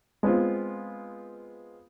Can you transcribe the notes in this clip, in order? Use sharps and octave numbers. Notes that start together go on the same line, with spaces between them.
G#3 B3 C4 F4